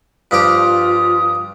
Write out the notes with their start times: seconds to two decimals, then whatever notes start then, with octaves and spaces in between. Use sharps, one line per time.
0.31 G2 F3 F4 G4 D#6